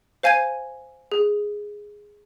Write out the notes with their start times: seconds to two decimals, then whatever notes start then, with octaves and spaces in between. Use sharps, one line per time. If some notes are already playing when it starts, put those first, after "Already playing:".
0.23 C5 F5 G#5 G#6 D#7
1.12 G#4